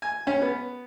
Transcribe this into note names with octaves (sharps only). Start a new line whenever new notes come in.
G#5
C#4
B3